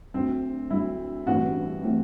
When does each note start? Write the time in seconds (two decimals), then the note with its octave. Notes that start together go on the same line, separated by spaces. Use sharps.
0.14 D2 D3 F#3 C4
0.70 D2 D3 F#3 E4
1.26 A1 G2 E3 A3 C4 F#4
1.84 E3 A3 C4